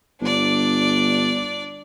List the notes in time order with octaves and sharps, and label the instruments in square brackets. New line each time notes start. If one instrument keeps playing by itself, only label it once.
[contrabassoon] G1 [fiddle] D4 D5